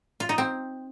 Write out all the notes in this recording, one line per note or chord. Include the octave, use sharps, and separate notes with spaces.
F4
D#4
C4